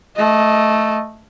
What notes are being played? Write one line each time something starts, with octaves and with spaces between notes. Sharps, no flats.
A3 D#5